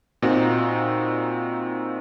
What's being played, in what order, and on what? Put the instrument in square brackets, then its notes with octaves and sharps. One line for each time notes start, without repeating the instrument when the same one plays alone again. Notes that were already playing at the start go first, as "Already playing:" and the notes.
[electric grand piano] A#2 C4 D#4 F#4